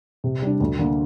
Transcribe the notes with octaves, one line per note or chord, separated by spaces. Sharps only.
C3
G3 D4
D2
D3 A#3